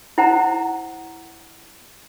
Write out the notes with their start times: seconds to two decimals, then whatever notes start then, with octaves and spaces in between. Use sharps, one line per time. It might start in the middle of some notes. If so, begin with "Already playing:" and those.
0.18 E4 C5 F#5 A#5